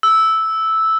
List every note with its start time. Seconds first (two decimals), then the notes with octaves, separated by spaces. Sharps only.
0.03 E6